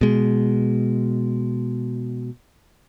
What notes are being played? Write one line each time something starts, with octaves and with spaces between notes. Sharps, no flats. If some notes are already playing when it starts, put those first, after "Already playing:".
B2 G#3